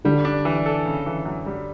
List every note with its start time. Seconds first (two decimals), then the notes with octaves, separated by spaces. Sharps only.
0.05 D3 G3
0.25 D4
0.45 E3
0.66 A4
0.86 C#3
1.06 E3
1.26 F#2
1.46 G3